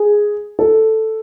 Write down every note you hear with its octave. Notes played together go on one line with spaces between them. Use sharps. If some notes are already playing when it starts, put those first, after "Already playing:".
Already playing: G#4
A4